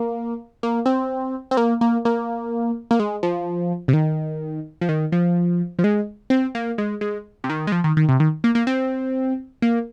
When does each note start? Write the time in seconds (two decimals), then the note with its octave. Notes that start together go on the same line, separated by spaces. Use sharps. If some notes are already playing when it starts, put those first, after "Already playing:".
Already playing: A#3
0.63 A#3
0.86 C4
1.51 C4
1.57 A#3
1.81 A#3
2.05 A#3
2.91 A#3
3.00 G#3
3.23 F3
3.88 C3
3.93 D#3
4.81 F3
4.89 D#3
5.12 F3
5.79 F3
5.84 G#3
6.30 C4
6.55 A#3
6.78 G#3
7.01 G#3
7.44 C3
7.50 D#3
7.67 G#3
7.72 F3
7.84 D#3
7.97 D#3
8.09 C3
8.20 D#3
8.44 A#3
8.55 A#3
8.67 C4
9.62 A#3